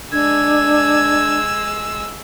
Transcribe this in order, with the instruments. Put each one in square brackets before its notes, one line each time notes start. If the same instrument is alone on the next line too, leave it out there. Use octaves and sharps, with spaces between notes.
[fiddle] G#3 E6 [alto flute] D4 [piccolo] G#6